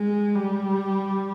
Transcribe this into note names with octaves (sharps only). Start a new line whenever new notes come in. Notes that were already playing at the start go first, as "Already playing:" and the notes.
Already playing: G#3
G3